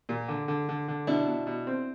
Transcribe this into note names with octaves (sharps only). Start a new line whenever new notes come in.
A#2
D3
D3
D3
D3
B2 D4 E4
B2
B2
C4